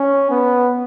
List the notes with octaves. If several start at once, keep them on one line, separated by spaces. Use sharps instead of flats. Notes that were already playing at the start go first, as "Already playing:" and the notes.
Already playing: C#4
B3